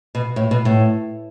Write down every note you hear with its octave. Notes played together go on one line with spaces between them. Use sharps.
B2
A2
B2
A2